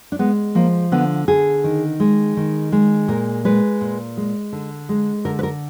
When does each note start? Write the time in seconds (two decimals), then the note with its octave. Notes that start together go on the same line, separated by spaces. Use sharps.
0.12 D4
0.19 G#3 B3
0.55 F3 A#3
0.92 D3 B3
1.28 D3 G#4
1.64 D#3
2.00 G#3
2.37 D#3
2.72 G#3
3.08 A#2 A#4
3.45 G#3 B4
3.81 A#2
4.17 G#3
4.52 D3
4.89 G#3
5.25 D3 A#4
5.39 B4
5.43 A#4